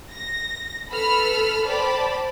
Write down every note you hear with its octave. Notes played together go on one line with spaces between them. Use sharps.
A#6
A4 B4 B5 E6 F6
C5 D5 G5 A5 B5